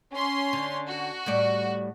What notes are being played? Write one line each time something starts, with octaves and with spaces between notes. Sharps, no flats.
C#4 C6
D3
F#4
A2 G3 D5